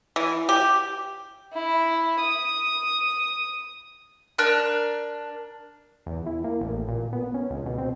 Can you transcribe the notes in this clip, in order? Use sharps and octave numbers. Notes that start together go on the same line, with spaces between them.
E3
G4
E4
D#6
D4 A#4 F#6
E2
E4
A#3
A1
A#2
B3
C#4
C#2
B2
C4